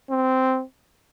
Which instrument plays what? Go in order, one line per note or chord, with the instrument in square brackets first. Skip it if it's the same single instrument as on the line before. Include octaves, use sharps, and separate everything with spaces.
[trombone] C4